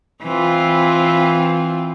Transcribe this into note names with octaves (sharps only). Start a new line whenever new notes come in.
E3 C4 F4